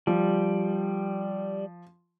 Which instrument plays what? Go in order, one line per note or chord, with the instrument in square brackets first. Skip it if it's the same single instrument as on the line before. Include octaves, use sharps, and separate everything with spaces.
[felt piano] F3 [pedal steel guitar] G3